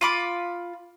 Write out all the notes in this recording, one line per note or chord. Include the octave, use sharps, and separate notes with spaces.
F4 B5 D6